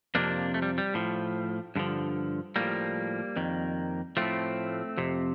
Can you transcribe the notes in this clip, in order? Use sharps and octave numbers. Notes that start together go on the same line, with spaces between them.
F2 C3 F3 A#3 D4
A3
G3
G3
A2 F3
G2 D3 F3
A2 F3 G3 A#3
F2 D#3
A2 F3 A3 C4
F2 C3